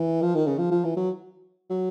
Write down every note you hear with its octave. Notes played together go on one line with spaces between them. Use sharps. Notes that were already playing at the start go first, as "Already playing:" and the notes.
Already playing: E3
F3
D#3
C#3
F3
F3
E3
F#3
F#3